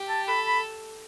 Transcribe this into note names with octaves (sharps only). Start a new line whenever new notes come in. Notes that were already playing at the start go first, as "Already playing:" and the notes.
Already playing: G4
A5
A4 B5
B5